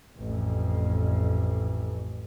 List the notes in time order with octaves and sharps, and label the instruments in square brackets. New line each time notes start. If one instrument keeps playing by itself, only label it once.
[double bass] A1 F2